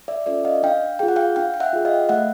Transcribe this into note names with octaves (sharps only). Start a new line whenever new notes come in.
D5 E5
C#4 F4 A4 D5 E5
D#5 F5
D4 F5 G5
F4 G#4 G5
F#5
F5 G5
D4 F5 G5
G5
E5 F#5
F4 G#4
D#5 F5
A3 E5 F#5